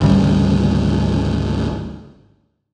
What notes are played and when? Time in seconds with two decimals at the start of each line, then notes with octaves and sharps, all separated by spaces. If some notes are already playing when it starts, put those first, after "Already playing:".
0.01 G#1 D2 C#3 G3